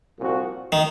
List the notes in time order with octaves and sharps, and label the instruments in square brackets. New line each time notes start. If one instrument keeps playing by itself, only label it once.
[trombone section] C2 A#2 F3 C4 F#4
[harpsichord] D#3